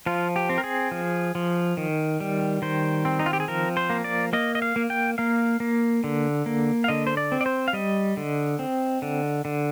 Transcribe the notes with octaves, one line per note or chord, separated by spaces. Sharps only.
F3 F4
G4
C4
A#4
G#4
F3
F3
D#3
G3
D#3 C5
C4
D#4
F4
G4
G#4
F3 A#4
C5
A#3
D5
A#3 D#5
D#5
F5
A#3
G5
A#3 F5
A#3
D3
A#3
F5
D3 D#5
C5
D5
C4
D5
C5
F5
G3 D#5
D3
C4
D3
D3